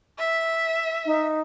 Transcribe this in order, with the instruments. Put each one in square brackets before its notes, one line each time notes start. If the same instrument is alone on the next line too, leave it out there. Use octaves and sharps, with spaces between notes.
[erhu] E5
[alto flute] D#4